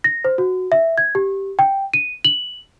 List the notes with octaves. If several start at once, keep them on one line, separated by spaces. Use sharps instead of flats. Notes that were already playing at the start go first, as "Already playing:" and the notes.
A#6
C5
F#4
E5
G#6
G4
G5
D#7
F#7